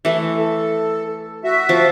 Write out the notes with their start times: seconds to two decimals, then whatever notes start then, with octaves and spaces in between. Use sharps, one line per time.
0.05 E3 A3
0.37 A4
1.44 F#4 E5
1.69 F3